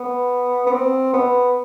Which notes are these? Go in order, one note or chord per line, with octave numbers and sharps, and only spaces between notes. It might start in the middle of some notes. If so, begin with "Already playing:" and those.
Already playing: B3
B3
C4
B3